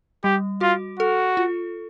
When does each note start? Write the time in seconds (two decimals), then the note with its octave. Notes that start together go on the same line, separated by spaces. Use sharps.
0.24 G3 G4
0.61 F4 F#4
0.99 F#4 A4
1.37 F4